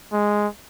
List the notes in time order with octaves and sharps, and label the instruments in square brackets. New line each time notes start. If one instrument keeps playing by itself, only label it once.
[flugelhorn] G#3